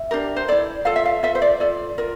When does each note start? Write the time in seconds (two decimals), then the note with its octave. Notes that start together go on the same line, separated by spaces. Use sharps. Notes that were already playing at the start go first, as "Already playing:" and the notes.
Already playing: E5
0.11 D4 G4 A#4
0.36 C5
0.48 E4 A4 D5
0.85 F4 A4 F5
0.96 E5
1.06 F5
1.23 F4 A4 E5
1.35 C5
1.42 D5
1.60 F4 A4 D5
1.98 F4 A#4